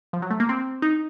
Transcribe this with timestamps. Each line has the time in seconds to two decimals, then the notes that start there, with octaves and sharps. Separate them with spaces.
0.13 F3
0.22 F#3
0.31 A3
0.40 A#3
0.49 C4
0.82 D#4